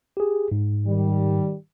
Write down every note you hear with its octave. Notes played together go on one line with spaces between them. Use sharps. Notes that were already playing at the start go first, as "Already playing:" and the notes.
G4 G#4
G#2
D#3 G3